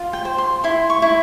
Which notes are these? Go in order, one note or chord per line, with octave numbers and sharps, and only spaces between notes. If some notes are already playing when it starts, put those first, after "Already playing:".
Already playing: F4
G5
C5
C6
E4 C6
C#6
E4